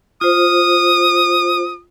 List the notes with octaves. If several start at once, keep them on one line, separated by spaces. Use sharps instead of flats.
F4 C5 D#6